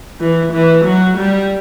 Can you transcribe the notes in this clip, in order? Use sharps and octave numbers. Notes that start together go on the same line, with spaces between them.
E3
E3
F#3
G3